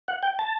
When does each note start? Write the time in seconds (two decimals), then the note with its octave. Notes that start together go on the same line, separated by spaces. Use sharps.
0.08 F#5
0.23 G5
0.39 A5